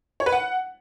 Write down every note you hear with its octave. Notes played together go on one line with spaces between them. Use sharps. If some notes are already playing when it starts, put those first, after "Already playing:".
C#5
B4
F#5